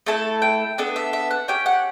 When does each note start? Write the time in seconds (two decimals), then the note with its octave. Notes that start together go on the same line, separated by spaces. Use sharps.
0.06 A3 E4 A4 A5
0.42 G5
0.78 B3 D4 A4
0.96 E5
1.13 E5
1.31 F#5
1.48 C#4 G4 G5
1.66 F#5